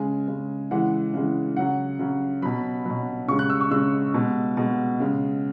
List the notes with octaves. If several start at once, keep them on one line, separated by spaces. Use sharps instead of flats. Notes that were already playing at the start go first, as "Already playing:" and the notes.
Already playing: C#3 G#3 G#5
C#3 G#3
C#3 E3 G#3 F#5
C#3 E3 G#3
C#3 F#3 F#5
C#3 F#3
B2 F#3 B5
B2 F#3
C#3 G#3 C#6
F#6
E6
C#6
C#3 G#3 E6
B2 G#3
B2 G#3
C#3 G#3